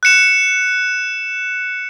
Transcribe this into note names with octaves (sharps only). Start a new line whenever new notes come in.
F#6 C#7 E7